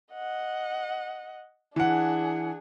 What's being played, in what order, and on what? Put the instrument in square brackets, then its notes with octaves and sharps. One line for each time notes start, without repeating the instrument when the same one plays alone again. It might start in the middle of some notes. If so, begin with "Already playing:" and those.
[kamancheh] D#5 F#5
[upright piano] E3 F#5 [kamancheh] D4 G#4